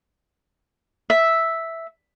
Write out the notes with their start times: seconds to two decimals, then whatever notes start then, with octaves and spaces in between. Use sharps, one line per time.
1.10 E5